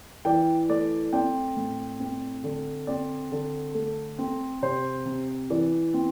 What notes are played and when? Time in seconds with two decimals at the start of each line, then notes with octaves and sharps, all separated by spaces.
0.25 E3 D5 G5
0.69 A3 D5
1.13 C4 D5 G5
1.57 A2
2.00 C4
2.44 D3
2.87 C4 D5
3.32 D3
3.75 A3
4.19 C4
4.62 C3 C5
5.05 C3
5.50 E3 D5
5.94 C4